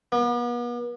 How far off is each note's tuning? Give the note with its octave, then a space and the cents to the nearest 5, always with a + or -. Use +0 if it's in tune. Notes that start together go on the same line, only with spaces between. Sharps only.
B3 -40